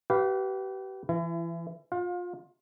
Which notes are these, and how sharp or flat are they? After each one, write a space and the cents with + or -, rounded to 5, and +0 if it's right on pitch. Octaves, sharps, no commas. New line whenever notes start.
G4 -35 B4 +0 F5 +0
E3 +25 E4 +40
F4 +25 F5 +35